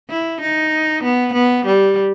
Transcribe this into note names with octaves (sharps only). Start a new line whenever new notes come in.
E4
D#4
B3
B3
G3